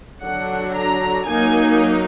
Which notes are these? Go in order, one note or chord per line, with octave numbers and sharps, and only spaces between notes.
D3 F#3 D4 F#5
A#5
F#3 A#3 D#4 G#5